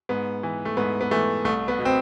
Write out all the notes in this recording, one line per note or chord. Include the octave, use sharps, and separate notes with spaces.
G#2 B3
E3
A3
G#2 B3
B3
E3 A3
C2 A3
B3
B2
C4